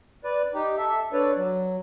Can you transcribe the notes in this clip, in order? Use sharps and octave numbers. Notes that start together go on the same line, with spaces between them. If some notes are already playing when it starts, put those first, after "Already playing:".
B4 D5
D#4 G4
A4 E5
D4 A4 B4 C#5 D5
F#3